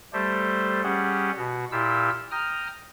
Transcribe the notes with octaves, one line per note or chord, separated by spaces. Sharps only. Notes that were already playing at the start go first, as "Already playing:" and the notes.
G3 A3 G4 A4 C5
G3 C#4 G4 G#4 F#5
B2 F#4
A#2 E4 F4 G4 E6
G5 A#5 D#6 F6